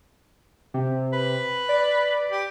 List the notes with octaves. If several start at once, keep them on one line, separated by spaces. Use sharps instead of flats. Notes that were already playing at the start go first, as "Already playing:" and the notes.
C3
B4
D5
G4